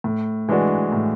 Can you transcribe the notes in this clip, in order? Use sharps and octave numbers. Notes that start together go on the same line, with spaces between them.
A2
E3 G#3 D4 F#4
A2